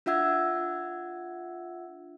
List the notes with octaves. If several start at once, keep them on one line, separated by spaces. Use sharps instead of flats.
D4 F4 E5 F#5 E6 G#6